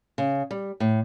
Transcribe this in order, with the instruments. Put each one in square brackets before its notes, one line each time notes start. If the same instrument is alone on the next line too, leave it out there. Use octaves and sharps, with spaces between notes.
[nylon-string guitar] C#3
G3
A2